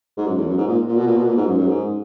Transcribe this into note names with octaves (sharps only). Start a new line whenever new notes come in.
G#2
F#2
E2
F#2
G#2
A#2
A#2
B2
A#2
B2
A#2
G#2
F#2
F#2
G#2